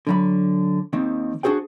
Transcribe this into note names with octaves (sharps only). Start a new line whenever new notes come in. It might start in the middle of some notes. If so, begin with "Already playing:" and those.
D3 F#3 B5
D#2 D#3 C4
D4 F#4 G#4 C5 G5